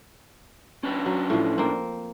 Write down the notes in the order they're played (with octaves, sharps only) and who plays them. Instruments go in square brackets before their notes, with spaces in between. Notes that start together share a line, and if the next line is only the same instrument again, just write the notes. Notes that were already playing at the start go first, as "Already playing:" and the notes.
[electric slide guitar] C#4 D4 B4
[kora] F#3
A2 F3
A#3 C4